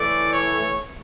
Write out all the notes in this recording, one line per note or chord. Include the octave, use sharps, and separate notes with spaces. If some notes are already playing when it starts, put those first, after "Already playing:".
Already playing: A2 E3 A3 D5
C#5